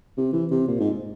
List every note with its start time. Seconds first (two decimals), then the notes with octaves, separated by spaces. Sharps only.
0.17 C3
0.33 E3
0.51 C3
0.68 A#2
0.80 G#2